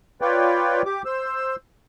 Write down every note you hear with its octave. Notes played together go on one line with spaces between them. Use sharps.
F4 B4 C#5 D5 G5
G4 D6
C5 E6